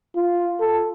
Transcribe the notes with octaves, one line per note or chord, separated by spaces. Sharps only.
F4
A4